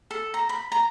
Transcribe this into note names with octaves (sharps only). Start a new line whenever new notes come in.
A4
A#5
B5
A#5